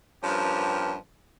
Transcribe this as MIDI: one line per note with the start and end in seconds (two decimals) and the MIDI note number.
0.24 0.95 43
0.24 0.95 53
0.24 0.95 59
0.24 0.95 61
0.24 0.95 67
0.24 0.95 70